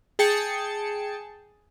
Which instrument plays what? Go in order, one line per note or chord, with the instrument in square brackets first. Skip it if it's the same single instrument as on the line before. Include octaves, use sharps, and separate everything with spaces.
[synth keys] G#4 G5 A5 C#7